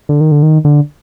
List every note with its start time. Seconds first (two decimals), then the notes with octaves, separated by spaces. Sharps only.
0.09 D3
0.21 D#3
0.32 D3
0.43 D#3
0.65 D3